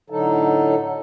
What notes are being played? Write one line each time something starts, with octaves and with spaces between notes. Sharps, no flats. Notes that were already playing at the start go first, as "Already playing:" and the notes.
A2 D3 F#3 D#4 A4